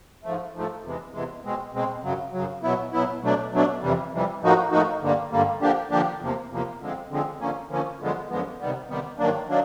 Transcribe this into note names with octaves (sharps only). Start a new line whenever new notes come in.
G#2 F3 A3
G#2 F3 A3
E2 C3 E3 G#3
E2 C3 E3 G#3
B2 G#3 C4
B2 G#3 C4
F#2 C#3 F#3
F#2 C#3 F#3
B2 F#3 B3 E4
B2 F#3 B3 E4
B2 F#3 A3 D4
B2 F#3 A3 D4
F2 C3 E3 G3
F2 C3 E3 G3
A2 F3 A#3 D#4 F#4
A2 F3 A#3 D#4 F#4
G2 D3 G3 A#3
G2 D3 G3 A#3
D3 F3 A#3 D4 G4
D3 F3 A#3 D4 G4
E2 C3 F3 A#3
E2 C3 F3 A#3
D3 F3 G#3 C4
D3 F3 G#3 C4
D3 F3 A#3 C#4
D3 F3 A#3 C#4
F#2 D3 F3 G#3 B3
F#2 D3 F3 G#3 B3
C3 D#3 G3 B3
C3 D#3 G3 B3
G2 D#3 F#3 A#3 D4
D#3 F#3 A#3 D4